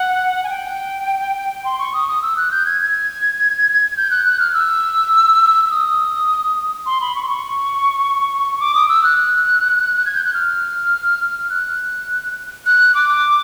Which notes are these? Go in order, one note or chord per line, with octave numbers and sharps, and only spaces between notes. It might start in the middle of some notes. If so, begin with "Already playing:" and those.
Already playing: F#5
G#5
G5
C6
C#6
D#6
D#6
E6
F#6
G6
G#6
G#6
G6
F#6
F#6
F6
E6
E6
D#6
C6
B5
C#6
C6
C#6
D6
D#6
E6
F#6
G#6
G6
F#6
F6
F#6
F#6
D6